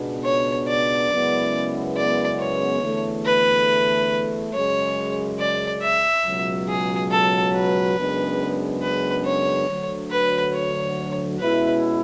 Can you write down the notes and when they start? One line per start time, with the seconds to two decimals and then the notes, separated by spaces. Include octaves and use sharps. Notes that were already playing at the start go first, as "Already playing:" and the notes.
Already playing: C#2 B2 G#3 B3 D4
0.24 C#5
0.68 D5
1.10 F#2 C#3 G#3 B3 E4
1.96 D5
2.39 C#5
2.82 E2 D3 A3
3.25 B4
4.53 F#2 C#3 G#3 C#5
5.39 D5
5.82 E5
6.24 C#2 B2 F#3
6.68 G#4
7.11 A4
7.54 B4
7.96 F#2 C#3 G#3 B3 D4
8.82 B4
9.26 C#5
9.69 D2 D3 F#3
10.11 B4
10.54 C#5
11.39 B2 G#3 C#4 E4 B4